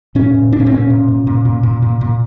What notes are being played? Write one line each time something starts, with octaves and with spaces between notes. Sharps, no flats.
A#2 C#4
A#2
A#2 D4
C#4
C4
A#2 C#4
A#2
A#2
A#2
A#2
A#2
A#2
A#2